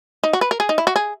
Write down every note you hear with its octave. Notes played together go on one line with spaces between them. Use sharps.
D#4
F#4
B4
A#4
G#4
D#4
E4
F#4
G#4